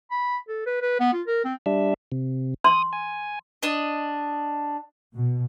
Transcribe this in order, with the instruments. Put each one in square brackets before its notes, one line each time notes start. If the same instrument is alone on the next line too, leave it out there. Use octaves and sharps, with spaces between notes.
[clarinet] B5
A4
B4
B4
B3
F4
A#4
C4
[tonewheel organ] G3 D4 E5
C3
[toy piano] C6 [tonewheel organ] D#6
[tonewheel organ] G#5
[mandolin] D4 D#5
[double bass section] B2